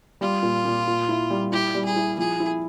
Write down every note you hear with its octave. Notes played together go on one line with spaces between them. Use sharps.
G3 F4
A#2
A#2
A#2
E4
G3
E4 G4
G3
G#4
E4
F3 G#4
E4